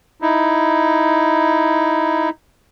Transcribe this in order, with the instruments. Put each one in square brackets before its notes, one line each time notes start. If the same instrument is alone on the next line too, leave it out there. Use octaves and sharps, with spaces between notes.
[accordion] D#4 E4